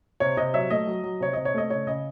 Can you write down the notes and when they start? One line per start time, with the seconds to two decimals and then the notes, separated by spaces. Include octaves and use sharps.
0.20 C3 C#5
0.37 C3 D#5
0.54 F#3 C#5 E5
0.70 A3 D#5
0.87 F#3
1.03 F#3
1.20 C3 C#5
1.33 C3 D#5
1.45 C#5
1.54 A3 D#5
1.70 C#3 C#5
1.87 C#3 D#5